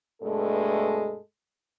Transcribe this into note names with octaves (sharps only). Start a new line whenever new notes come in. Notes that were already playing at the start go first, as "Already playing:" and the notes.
G2 B2 G#3 A3 A4